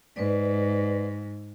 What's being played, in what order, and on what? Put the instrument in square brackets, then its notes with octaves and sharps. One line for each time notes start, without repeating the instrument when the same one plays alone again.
[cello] G#2 [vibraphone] B4 D5